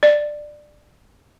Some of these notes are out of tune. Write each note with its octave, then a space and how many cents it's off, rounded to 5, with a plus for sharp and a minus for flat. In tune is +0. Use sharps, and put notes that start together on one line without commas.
D5 +15